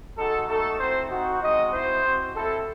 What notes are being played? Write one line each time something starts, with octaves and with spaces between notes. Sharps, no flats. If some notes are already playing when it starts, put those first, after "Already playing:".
G#3 D#4 F#4 A4
A3 D#4 F#4 A4
C4 E4 C5
C4 D#4 F#4
G#3 C4 D#4 F#4 D#5
C4 E4 C5
C4 F#4
C4 E4 A4